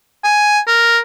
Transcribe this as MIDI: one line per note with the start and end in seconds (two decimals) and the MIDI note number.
0.24 0.60 80
0.67 0.98 70